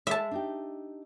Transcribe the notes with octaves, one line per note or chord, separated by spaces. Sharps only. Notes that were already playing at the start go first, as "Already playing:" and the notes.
G#3 E5 A5
D4 D#4 G4